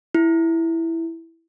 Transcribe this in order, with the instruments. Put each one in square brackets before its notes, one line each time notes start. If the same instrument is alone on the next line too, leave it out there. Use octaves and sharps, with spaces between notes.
[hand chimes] E4